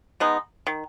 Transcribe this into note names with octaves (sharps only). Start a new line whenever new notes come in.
G#3 B3 D#4
D#3